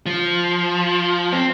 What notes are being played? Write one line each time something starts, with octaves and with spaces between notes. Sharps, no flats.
F3
C4